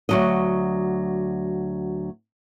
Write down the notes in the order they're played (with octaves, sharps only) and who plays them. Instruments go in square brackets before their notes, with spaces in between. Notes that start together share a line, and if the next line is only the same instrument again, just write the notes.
[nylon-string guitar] D2 F#3 D#5